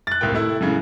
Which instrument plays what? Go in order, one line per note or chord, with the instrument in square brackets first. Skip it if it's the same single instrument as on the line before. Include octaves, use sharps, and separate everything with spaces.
[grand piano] F#6 A6
C2 A2 A#3 G5
A3 E4
F#2 A2 C#3